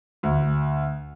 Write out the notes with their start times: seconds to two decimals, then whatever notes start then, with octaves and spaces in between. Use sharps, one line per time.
0.23 D2